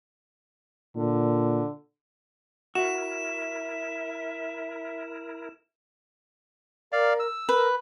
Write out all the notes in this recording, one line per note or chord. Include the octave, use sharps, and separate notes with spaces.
A#2 D3
E4 F#4 A#4 E5 E7
A#4 D5 F5
E6
A#4 B4